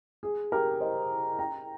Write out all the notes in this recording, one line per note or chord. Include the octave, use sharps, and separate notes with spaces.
G#4
G4 A#4
C5 D#5
G5 A#5